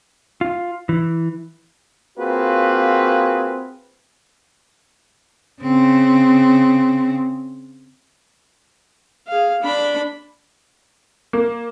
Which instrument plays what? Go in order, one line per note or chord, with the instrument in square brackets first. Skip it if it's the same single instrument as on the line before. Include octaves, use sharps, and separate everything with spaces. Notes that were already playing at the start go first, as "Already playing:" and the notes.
[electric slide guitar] F4
E3
[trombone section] A#3 C4 F4 F#4 G#4 B4
[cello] C#3 C4
[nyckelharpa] G#4 F5
D4 B5
[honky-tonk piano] A#3